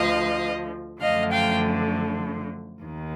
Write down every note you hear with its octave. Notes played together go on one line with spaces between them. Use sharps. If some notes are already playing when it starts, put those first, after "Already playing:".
Already playing: D2 D3 F3 D#5 F5
F#2 D3 F3 A3 D#5 F5
F5 G5
D#2 D#3